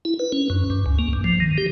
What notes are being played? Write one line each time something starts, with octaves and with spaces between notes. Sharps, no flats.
E4
B4
C#4
F#2
G2
C#2
A#3
G2
F3
D#3
G4